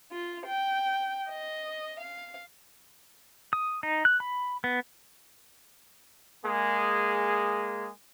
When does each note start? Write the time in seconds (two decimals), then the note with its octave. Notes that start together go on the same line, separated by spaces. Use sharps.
0.11 F4
0.46 G5
1.29 D#5
2.00 F5
3.53 D#6
3.83 D#4
4.05 F#6
4.20 B5
4.64 B3
6.45 G#3 A#3 G#4